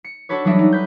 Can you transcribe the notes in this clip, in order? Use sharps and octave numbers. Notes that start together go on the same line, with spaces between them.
C#7
D4 F#4 A4 B4 C#5
E3 F#3 G3 D4 D#5 E5
D#4 D#5
B4 G6